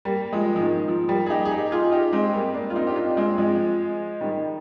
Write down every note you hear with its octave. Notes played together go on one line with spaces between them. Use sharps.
G3 A#3
F3 G#3
F3
D#3
F3
G3 A#3
G#4
D#4 G4
G#4
D#4 G4
F4 G#4
D#4 G4
G#3 C4
G3 A#3
A#3 D4
F4
C4 D#4
G4
D4 F4
G#3 C4
F3 G#3
D#3 G3